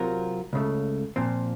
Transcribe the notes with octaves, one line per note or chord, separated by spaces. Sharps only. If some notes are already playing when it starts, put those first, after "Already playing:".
Already playing: C3 F#3 C4 F4 A#4
C#2 C#3 A3
A#2 F3 C4